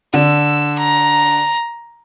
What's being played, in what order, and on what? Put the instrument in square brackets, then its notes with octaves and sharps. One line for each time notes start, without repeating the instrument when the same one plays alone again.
[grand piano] D3 [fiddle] E6
[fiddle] A#5